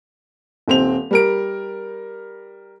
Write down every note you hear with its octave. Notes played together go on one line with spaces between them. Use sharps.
D#1 C4 F7
G3 A#4 D7